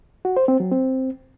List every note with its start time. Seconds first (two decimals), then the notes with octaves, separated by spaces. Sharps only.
0.25 F#4
0.37 C5
0.48 C4
0.60 F#3
0.72 C4